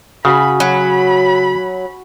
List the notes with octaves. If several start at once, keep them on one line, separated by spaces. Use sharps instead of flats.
C#3 F#4 G#5 B5
F#3 B5